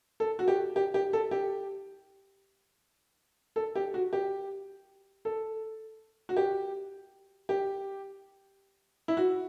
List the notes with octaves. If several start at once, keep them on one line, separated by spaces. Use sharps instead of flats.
A4
F#4
G4
G4
G4
A4
G4
A4
G4
F#4
G4
A4
F#4
G4
G4
E4
F#4